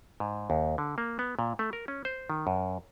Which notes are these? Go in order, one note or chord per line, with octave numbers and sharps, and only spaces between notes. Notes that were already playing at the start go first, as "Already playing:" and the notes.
G#2
D#2
D3
A#3
B3
A#2
A3
A#4
C#4
C5
D#3
F#2